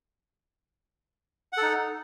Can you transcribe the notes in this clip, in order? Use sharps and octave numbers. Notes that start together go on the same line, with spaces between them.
D#4 A4 F#5